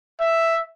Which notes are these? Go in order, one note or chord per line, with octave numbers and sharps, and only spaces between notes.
E5